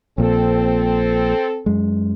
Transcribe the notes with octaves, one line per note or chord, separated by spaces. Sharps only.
A#1 A#2 C4 A4
F#2 G#3